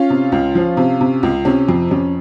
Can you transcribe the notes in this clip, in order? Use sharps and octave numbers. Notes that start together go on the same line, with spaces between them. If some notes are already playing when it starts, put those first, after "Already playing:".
Already playing: C#4 F4
C3
C#2
F3
C3
C3
C#2
C3 C#4
F2
F2 C#4